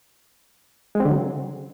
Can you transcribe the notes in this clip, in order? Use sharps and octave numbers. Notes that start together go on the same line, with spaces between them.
G#3
C4
D3
F#3
C#3